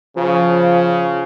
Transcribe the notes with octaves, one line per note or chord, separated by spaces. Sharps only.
C#3 F3